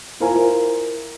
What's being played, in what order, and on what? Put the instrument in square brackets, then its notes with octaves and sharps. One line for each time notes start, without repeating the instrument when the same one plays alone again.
[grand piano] E4 F4 A#4 C5 G#5